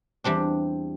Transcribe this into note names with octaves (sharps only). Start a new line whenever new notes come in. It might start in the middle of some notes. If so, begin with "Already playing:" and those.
E2 G3 C4 D4